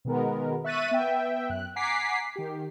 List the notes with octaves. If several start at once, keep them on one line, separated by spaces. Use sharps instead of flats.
B2 D#3 G#3 B3 A#4
E5 C#6 F#6 A6 B6 D#7
B3 E5 G5
F#2 F#6
F#5 G#5 A#5 D6 B6 C7
D#3 G4